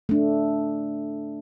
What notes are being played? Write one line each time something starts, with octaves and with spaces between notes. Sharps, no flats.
A3 D4